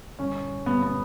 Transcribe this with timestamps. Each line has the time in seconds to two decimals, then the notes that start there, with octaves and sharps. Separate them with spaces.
0.19 G2 D3 G3 C#4
0.66 G2 D3 G3 B3
0.82 B3